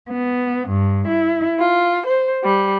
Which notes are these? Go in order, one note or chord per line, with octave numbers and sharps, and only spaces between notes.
B3
G2
E4
F4
C5
G3